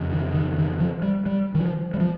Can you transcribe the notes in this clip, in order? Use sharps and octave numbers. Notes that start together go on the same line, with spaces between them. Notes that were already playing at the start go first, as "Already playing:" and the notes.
Already playing: F2 C#3
D#3
D#3
D#3
F3
G3
G3
D#3
F3
G3
F3